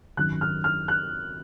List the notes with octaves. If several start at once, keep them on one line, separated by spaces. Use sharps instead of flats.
G#1 F#2 D#3 F#6
F6
F6
F#6